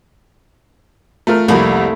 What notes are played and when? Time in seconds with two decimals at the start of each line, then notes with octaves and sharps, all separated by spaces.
1.27 A3 F4 A#4
1.48 C2 F2 G3 A3 A#3 E4